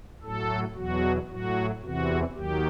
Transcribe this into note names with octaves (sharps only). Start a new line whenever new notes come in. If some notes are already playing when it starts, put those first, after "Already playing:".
A2 F#3 A4
E2 B2 F#3 F#4
A2 F#3 F#4
E2 C3 E3 F#4
D#2 D#3 F#3 G4